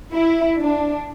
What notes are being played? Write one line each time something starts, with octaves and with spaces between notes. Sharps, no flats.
E4
D4